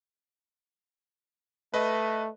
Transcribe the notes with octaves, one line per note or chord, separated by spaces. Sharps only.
A3 B4 D#5